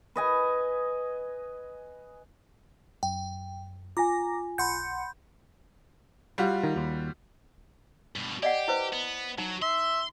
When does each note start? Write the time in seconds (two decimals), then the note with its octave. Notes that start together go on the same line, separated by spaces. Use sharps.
0.16 B4 D#5 G#5
3.03 F#2 G5
3.97 F4 G#5 A#5 D6 A#6
4.58 B1 F#5 B5 C6 G6 C#7
6.38 G3 F4 F#4
6.63 D#3
6.76 D#2
8.16 G2 B2
8.43 G4 D5 D#5 F#5
8.68 E4 B4 C5
8.93 B3
9.38 F#3 D#4
9.62 E5 C6